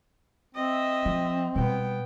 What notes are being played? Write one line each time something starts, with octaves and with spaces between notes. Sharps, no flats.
C4 D#5 E5
F3
B2 G3 B3 G5